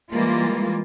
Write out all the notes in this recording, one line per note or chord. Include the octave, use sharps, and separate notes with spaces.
E3 G3 G#3 A#3 F4